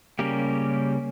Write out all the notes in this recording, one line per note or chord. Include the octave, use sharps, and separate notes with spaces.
C#3 G3 A#3 C#4 G4 A#4